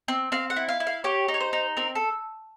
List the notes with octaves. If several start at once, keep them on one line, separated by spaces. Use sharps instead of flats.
C4
C4 F5
F#5
E4
F5
E4
F5
G4 C#5
D#4
C#5
C5
D#4
C4 A#4
A4